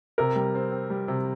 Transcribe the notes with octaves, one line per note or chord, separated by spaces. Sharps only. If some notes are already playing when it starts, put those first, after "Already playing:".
C3 A#4
G3
C4
C4
G3
C3